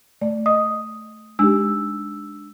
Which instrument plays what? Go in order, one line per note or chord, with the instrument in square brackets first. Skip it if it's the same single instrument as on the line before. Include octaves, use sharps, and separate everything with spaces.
[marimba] A3 D5
[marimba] D#5 [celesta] D#6
[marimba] G#3 D#4 G4 [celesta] D4 E6